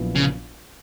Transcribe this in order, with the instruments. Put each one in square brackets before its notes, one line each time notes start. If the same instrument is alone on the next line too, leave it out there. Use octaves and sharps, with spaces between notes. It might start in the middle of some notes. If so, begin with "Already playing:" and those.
Already playing: [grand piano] A#1 A#2 F#3 B3 E4
[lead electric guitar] C#3